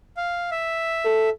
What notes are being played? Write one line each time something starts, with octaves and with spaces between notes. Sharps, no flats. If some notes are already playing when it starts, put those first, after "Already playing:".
F5
E5
A4